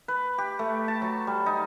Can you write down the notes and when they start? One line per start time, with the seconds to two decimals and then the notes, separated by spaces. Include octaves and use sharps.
0.08 B4
0.38 G4
0.59 A3
0.88 A5
1.02 F#3
1.27 G3
1.46 D#4